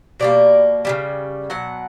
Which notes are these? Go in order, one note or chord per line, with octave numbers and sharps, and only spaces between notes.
B2 G3 A#3 D5
C#3 E3 G3
B2 F#3 F#5